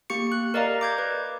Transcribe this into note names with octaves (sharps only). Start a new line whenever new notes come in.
A#3 G4 C#6 C#7
F#6 C#7
A#4 D5 D#5 F5 A#5
D6 G6 G#6
B4